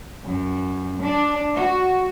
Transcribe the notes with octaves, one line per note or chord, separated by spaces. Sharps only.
F#2
D4
F#4